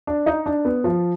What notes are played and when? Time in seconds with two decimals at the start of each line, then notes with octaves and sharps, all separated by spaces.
0.07 D4
0.26 D#4
0.46 D4
0.65 B3
0.84 F3